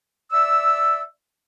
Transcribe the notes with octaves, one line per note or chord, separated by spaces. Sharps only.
D5 E5 E6